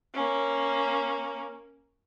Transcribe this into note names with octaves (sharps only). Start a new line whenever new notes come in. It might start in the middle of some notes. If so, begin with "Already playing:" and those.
A#3 C#4